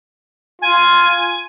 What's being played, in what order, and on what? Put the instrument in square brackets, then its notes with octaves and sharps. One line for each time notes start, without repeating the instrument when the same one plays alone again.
[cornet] F4 [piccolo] G#5